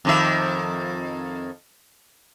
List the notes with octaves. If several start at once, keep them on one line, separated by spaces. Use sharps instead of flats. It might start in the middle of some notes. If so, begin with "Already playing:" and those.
F2 D#3 E5